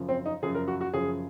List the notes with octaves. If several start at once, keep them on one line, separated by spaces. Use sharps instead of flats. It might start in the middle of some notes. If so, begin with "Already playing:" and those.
Already playing: F#2 C#3 F3
C4
D#4
F#2 C#3 F3 G#4
A#4
F#4
F#4
F#2 C#3 F3 G#4